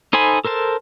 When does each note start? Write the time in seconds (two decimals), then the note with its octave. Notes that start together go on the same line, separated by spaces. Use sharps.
0.13 D#4 A4 C5 G#5 B5
0.45 A4 A#4 C5 A5